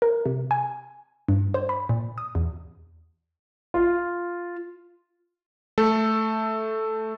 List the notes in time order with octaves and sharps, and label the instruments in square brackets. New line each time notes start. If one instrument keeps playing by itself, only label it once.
[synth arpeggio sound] A#4
C3
G#5
G2
C5
B5
A#2
D#6
E2
[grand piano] F4
[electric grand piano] A3 A4